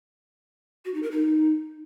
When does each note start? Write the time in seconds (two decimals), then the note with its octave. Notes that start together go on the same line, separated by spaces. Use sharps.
0.85 F#4
0.94 D#4
1.03 A#4
1.11 D#4